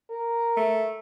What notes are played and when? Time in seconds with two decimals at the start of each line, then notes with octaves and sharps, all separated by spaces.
0.10 A#4
0.57 A3